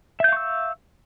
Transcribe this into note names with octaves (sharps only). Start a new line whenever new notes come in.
E5 F5 C#6 E6 G6